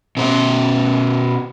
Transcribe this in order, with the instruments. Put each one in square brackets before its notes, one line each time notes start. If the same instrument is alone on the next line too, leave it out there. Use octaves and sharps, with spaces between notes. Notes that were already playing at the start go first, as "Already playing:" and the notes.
[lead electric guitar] B2 C5